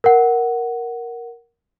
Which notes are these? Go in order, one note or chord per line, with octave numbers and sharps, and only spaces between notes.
A#4 F#5